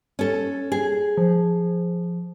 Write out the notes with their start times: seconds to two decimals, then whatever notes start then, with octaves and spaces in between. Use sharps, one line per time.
0.19 C#4 A4
0.72 G#4
1.18 F3